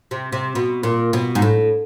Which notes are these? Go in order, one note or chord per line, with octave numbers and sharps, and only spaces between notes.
C3
C3
B2
A#2
B2
G#2
A2